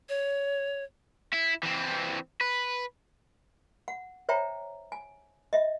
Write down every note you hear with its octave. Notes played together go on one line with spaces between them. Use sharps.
C#5
E4
E3 C4
B4
F#5
C5 C#5 E5 G5 A#5
G#5
D#5 E5